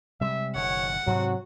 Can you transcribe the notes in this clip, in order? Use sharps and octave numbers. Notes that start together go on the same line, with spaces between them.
C3 G3 G#3 E5
F#1 B2 D#3 C#5 F#5
G#2 C3 F#3 C4 F#4